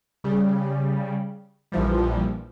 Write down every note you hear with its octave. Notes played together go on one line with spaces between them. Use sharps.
C#3 G3
A#1 E3 F3 G3